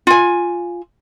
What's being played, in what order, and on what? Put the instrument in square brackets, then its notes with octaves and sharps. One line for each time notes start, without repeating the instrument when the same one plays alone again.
[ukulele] F4 G#5